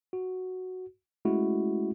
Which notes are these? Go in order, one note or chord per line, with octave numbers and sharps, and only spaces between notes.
F#4
G#3 A3 C#4 E4 F#4